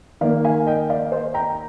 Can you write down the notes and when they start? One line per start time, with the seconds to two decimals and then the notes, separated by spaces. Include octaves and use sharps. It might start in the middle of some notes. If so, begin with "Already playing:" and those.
0.21 D#3 A#3 D5 F5
0.45 F5 G#5
0.66 D#5 G5
0.89 D5 F5
1.12 C5 D#5
1.34 G5 A#5